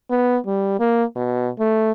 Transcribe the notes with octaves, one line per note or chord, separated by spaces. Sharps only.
B3
G3
A#3
B2
A3